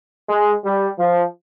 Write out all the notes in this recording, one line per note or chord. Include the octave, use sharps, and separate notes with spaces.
G#3
G3
F3